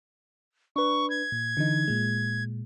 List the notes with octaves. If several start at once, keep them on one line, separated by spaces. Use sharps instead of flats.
D4 B4 C#6
G#6
A#2
D3 E3 D#4
A#2 G#3